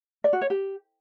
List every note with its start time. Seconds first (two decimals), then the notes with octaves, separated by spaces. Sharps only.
0.24 D5
0.33 F#4
0.41 C#5
0.50 G4